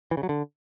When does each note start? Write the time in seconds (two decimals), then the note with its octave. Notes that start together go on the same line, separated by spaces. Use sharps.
0.11 E3
0.17 C#3
0.23 F#3
0.29 D3